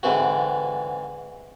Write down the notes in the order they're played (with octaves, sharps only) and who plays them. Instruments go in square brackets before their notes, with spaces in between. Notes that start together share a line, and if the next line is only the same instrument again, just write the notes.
[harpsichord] G#2 D3 E3 C4 F#4